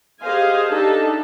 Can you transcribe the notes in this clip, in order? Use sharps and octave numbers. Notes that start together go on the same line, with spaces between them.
G4 G#4 C5 D#5 F5 G#5
D4 D#4 G4 A4 E5 A5